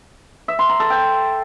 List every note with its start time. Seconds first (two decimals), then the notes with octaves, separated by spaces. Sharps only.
0.48 E5
0.59 C6
0.69 A#5
0.80 A4
0.90 G5